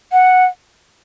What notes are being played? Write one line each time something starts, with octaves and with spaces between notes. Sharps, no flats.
F#5